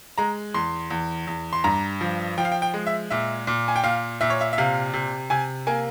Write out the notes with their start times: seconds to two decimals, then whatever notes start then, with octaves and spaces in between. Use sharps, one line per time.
0.18 G#3 A#5
0.54 E2 C6
0.90 E2
1.27 E2
1.53 C6
1.64 G2 A#5
2.01 F3
2.38 F3 G5
2.45 F5
2.52 G5
2.62 G5
2.74 G#3
2.87 E5
3.10 A#2 E5
3.47 A#2
3.68 G#5
3.76 G5
3.84 A#2 F5
4.21 A#2 E5
4.30 C#5
4.41 E5
4.53 E5
4.58 C3 F5
4.94 C3
5.30 C3 G#5
5.67 A#3 G#5